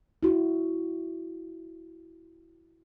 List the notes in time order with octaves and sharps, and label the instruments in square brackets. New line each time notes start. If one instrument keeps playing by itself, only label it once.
[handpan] E4 F#4